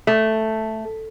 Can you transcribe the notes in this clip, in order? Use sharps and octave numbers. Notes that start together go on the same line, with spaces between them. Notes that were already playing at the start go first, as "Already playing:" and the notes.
A3